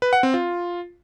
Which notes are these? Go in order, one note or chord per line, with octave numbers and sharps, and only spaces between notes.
B4
F#5
C4
F4